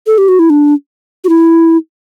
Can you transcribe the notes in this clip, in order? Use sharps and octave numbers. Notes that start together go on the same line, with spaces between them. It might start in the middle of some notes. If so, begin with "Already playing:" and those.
A4
G4
F#4
E4
D4
F#4
E4